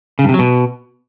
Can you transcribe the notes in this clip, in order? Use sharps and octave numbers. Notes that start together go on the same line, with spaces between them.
C#3
G2
C3
F#3
B2